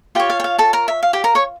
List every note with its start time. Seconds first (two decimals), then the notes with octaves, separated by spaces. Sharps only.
0.15 F4 G4 C#5 G5
0.30 F5
0.40 G5
0.44 F5
0.59 A4 A5
0.73 A#4 A#5
0.88 E5
1.03 F5
1.13 G4 G5
1.24 A#4 A#5
1.35 C#5 C#6